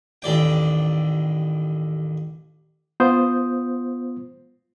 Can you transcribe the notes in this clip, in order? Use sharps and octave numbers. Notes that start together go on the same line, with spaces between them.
A1 D#2 D5 G5
B3 F4 C5 D#6 G6